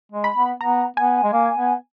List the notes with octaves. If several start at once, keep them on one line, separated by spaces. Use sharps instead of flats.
G#3
B5
B3
B3 A#5
B3 G#5
G#3
A#3
B3